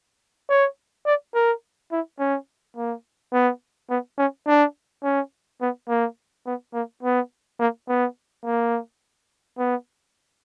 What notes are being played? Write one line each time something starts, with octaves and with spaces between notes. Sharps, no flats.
C#5
D5
A#4
E4
C#4
A#3
B3
B3
C#4
D4
C#4
B3
A#3
B3
A#3
B3
A#3
B3
A#3
B3